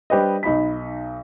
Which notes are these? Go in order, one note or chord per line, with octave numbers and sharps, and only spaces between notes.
G3 D4 G4 B4 C5 D#5
B1 D#4 B5 B6